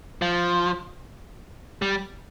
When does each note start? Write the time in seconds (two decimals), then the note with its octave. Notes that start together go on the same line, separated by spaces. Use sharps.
0.22 F3
1.82 G3